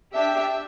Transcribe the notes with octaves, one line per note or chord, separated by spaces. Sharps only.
D4 G4 E5